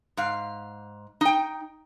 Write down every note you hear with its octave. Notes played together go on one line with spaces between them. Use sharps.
G#2 F5
D#4 G5